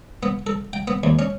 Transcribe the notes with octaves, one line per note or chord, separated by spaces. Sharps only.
B3
A4
G5
B3
D#2
C#4